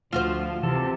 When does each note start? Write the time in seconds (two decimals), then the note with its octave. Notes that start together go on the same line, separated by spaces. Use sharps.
0.13 D2 F3 F4 F#4 C5
0.63 C3 E3 A4